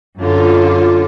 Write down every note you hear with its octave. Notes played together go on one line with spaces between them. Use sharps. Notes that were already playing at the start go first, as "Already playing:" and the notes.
F#2 D3 F4